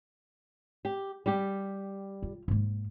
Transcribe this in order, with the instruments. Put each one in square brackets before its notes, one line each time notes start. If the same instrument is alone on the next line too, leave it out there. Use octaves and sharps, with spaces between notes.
[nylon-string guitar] G4
G3 G4
[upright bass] F4
G#2 A#3